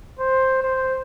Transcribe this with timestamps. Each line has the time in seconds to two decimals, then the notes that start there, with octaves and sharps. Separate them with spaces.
0.19 C5
0.63 C5